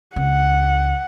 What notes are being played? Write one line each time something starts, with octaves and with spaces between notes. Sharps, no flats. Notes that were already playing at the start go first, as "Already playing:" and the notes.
C#2 F#5